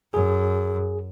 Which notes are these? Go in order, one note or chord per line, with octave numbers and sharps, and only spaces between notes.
F#2 G#4